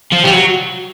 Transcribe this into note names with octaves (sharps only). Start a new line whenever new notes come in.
F3
G3
F#3